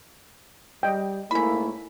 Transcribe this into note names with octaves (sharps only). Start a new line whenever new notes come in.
G3 D#5 G5
G#2 A3 A#3 C#4 E4 B5